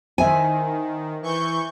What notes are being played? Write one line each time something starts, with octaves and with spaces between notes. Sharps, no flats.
D#3 C5 E5 G#5
E3 C#6 G6